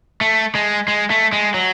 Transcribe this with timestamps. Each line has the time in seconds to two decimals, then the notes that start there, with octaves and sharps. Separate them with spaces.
0.21 A3
0.55 G#3
0.88 G#3
1.10 A3
1.33 G#3
1.54 F#3